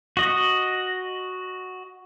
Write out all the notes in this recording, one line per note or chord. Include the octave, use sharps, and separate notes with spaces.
F#4 D#5